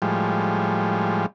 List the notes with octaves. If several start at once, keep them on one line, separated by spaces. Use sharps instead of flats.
A2 F3 G3 G#3